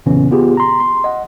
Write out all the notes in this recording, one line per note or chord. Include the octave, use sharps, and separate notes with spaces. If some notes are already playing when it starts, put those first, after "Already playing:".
F2 A#2 C#3 E3 B3 C#4
B3 F4 G4 G#4
A#5 C6
C6
D#5 F#5